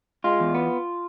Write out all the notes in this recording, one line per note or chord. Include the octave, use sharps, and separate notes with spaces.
G#3 F4
E2
B3